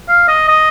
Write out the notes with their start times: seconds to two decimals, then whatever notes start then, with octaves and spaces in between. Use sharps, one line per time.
0.09 F5
0.28 D#5
0.48 D#5